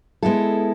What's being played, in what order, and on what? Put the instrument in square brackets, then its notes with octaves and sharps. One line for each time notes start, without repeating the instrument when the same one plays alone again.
[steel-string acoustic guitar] G#3 B3 E4 A4